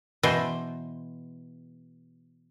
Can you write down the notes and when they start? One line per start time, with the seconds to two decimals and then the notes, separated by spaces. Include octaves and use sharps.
0.23 B2 E3 C5